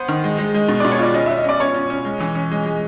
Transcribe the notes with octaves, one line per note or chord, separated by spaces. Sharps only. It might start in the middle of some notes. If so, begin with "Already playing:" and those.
Already playing: B3 C5
D#3
G#3
G#3
G#3
B2
B2 D5
C#5
F4 D5
C#4 D#5
C#4 E5
D#5
C#4 D5
C#4 C#5
C#4
C#4
G#3
E3
C#4
G#3
G#3